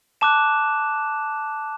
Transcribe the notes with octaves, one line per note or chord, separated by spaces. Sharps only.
A5 D6 F#6 E7